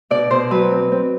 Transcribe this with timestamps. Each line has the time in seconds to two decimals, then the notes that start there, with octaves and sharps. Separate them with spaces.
0.10 B2 D5
0.31 B2 C5
0.51 F#3 B4
0.71 C4
0.92 C4